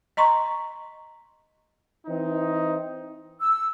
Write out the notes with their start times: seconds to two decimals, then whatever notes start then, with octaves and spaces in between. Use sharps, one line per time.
0.17 D#5 A#5 C6 C#6
2.06 E3 C4 D#4
3.40 E6